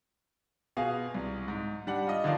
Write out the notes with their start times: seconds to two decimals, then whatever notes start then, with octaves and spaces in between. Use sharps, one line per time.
0.77 B2 F4 G#4 F5
1.14 C2
1.48 G#2
1.87 G3 D4 F#5
2.07 F4 D#5
2.24 D3 D#3 F3 D5 F5